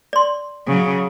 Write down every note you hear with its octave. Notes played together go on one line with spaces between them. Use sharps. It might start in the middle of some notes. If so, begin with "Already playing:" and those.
D5 C6
C#3 F#3